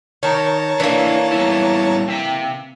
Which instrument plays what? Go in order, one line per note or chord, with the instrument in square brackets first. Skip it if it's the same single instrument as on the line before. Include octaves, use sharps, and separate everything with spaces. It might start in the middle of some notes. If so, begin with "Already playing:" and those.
[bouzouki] D#3 [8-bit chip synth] C#5 A5 A#5
[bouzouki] E3 A#3 [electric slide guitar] D4 E4
[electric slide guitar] G3 B3 E4
C4 E5 G5